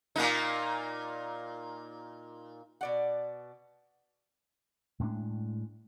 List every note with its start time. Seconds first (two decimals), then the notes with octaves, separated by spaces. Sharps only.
0.16 A#2 A#3 D#4
2.81 B2 D5 F#5
5.00 A2 G#3 A3 D4